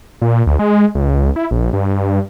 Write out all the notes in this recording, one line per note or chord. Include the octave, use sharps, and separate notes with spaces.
A#2
D2
G#3
C#2
E4
A#1
G2